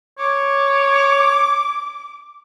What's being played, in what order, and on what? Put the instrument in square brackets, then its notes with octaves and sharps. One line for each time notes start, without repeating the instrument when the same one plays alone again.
[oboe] C#5 [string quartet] D6